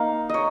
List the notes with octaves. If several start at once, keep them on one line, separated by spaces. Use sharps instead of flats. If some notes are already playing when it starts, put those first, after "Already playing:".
Already playing: A#3 D#4 F5
C#5 D#5